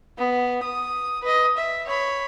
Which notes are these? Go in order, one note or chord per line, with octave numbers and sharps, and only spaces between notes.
B3
D#6
B4 D#5
E5
C#5 B5